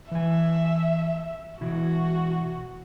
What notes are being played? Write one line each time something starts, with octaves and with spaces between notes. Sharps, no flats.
E3 E5 G#5
B2 E3 E4 F#4